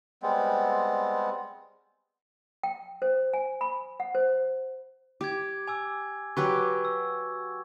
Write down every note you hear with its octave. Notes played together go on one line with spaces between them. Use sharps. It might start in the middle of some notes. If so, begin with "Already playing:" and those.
G3 G#3 B3 C4
G5
C5
G#5
B5
F#5
C5
G4 D6 G#6
G#5 D6 E6
F#3 G4 B4 C#6 E6 G#6
E6